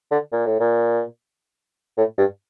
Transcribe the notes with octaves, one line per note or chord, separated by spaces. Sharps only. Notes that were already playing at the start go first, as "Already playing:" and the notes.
D3
A#2
A2
A#2
A2
G2